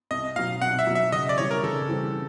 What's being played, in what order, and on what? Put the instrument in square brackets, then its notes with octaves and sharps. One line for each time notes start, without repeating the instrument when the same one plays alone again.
[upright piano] C2 [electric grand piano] D#5
[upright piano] B2 F#3 [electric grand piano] F5
[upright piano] C2 [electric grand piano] F#5
[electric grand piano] E5
[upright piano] B2 F#3
[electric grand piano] E5
[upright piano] C#3 [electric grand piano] D#5
[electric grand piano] D5
[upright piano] E3 G3 C4 [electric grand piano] C#5
[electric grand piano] A#4
[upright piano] C#3 [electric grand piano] A4
[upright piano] E3 G3 C4